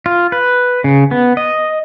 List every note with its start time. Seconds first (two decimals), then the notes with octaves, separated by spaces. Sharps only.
0.06 F4
0.32 B4
0.84 C#3
1.11 B3
1.37 D#5